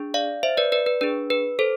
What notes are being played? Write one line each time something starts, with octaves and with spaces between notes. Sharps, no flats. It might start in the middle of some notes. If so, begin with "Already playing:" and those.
Already playing: D4 G#4
D5 F5
C5 E5
B4 D5
B4 D5
B4
D4 G#4 B4
B4
A4 C5